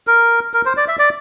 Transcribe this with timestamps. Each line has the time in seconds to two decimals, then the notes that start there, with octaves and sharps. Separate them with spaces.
0.07 A#4
0.54 A#4
0.65 C5
0.77 D5
0.88 E5
0.99 D5